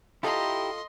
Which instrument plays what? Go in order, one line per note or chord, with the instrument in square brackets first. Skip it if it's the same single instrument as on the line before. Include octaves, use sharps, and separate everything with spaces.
[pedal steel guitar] E4 G4 A#5 [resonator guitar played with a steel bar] F4 A4 [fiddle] D#5 C6